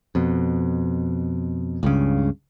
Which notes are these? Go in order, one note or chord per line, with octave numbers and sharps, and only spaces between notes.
F2 B2
C#2 G2 C#3